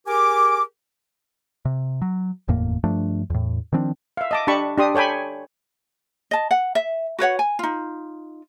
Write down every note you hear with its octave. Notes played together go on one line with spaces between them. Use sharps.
G4 G#4 A#4 G#5 D6
C3
F#3
F#1 E2 A2 A#3
G2 F3 A3 D4
E2 A2
D#3 F3 C4 D4
E5 F5
D#5 A5 D6
D4 G4 A5 B5 C#6
D4 G4 C6 D#6
A4 C#5 G5 G#5 B5
D#5 A5
F#5
E5
F#4 B4 C#5 F#5
G#5
D#4 F4